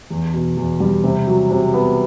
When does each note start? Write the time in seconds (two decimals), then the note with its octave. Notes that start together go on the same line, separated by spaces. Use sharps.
0.10 E2
0.34 B2
0.57 E2
0.80 G3
1.04 C3
1.27 F#3
1.51 C3
1.74 B3